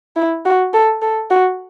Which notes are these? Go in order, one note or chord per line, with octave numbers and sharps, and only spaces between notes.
E4
F#4
A4
A4
F#4